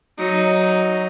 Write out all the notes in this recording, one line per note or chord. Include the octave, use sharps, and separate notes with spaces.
F#3 D#4